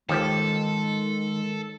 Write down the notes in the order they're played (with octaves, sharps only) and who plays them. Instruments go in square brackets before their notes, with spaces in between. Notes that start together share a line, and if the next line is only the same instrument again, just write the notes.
[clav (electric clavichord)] D#2 F3 G4 [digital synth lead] D#3 [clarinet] G#3 [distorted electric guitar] A4